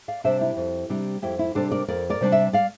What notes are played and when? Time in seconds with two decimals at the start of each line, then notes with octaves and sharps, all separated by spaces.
0.08 D5 F5
0.24 C3 G3 D4 C5 E5
0.41 E4 G4
0.57 F2
0.89 C3 G3 D4
1.22 F2 E4 G4
1.39 E4
1.55 C3 G3 D4 A4 C5
1.71 A#4 D5
1.88 F2 A#4 D5
2.10 A#4 D5
2.21 C3 G3 D4
2.32 C5 E5
2.53 D5 F5